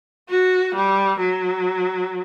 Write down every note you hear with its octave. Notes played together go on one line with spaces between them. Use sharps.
F#4
G3
F#3